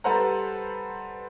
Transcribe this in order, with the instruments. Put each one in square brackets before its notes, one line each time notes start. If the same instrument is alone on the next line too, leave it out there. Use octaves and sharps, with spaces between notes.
[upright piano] G3 A4 B4 C5 F#5 A#5